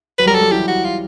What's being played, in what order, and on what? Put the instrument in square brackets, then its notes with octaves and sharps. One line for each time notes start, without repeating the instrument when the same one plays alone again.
[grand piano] F#3 [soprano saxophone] B4
[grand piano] G3 [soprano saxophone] A#4
[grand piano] F#3 [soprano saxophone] A4
[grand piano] G3
[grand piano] E3 [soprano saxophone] G4
[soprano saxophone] F#4
F4